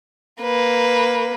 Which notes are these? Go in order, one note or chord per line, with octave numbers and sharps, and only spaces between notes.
A#3 B4